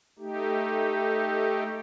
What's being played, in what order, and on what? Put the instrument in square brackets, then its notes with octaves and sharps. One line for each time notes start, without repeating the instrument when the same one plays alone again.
[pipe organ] A3 D#4 G4